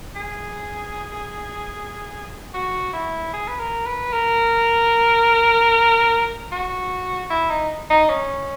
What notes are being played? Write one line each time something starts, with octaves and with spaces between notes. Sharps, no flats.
G#4
F#4
E4
G#4
B4
A#4
B4
A#4
F#4
E4
D#4
D#4
C#4